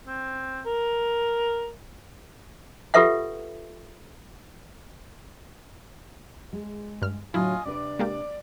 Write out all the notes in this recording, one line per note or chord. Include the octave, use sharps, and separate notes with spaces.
C4
A#4
F4 G4 A4 B4 E5 F#5
G#3
G2 F6
A2 D3 F#3 E4 F4 D#5 G#5
C3 D4 B4 D5
G#3 A#3 G4